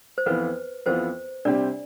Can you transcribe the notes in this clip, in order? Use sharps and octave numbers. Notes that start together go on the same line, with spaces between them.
C5
F2 E3 B3 F4 B4
F2 E3 B3 F4 C5
C3 G3 C4 D4 G4 D5